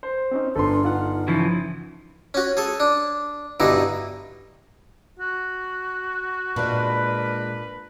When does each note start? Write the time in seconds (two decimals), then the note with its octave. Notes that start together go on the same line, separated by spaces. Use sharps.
0.03 C5
0.32 C4 C#4 D#4
0.56 G1 D4 A4 B4 C6
0.85 D#4 F4 F#5 F6
1.28 C#3 E3 F3
2.34 C#4 F#4
2.57 G#4 A4
2.80 D4
3.60 G2 B2 D3 D#4 E4
5.19 F#4
6.56 A#2 G#3 D4 A#4 B4